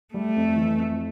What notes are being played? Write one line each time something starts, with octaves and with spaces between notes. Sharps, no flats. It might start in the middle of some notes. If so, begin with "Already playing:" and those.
G3 A3
F2
E3
F2